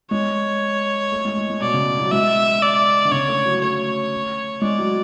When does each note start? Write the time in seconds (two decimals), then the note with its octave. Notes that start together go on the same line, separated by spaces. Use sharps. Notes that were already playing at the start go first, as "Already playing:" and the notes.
0.11 G#3 C#5
1.12 A3
1.25 G#3
1.37 G#3
1.50 G#3
1.61 B2 D5
1.74 C#3
2.00 F#3
2.11 G#3 E5
2.62 D5
3.05 D3
3.11 C#3 C#5
3.28 A3
3.46 F#3
3.61 A3 C#5
4.62 G#3 D5
4.79 F#3